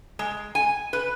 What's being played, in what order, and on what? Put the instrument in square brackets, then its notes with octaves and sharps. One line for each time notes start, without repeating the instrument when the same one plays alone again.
[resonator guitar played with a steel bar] G#3
G#5
B4